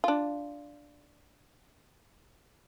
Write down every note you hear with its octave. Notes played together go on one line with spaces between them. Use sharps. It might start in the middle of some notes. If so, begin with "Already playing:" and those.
D4 F4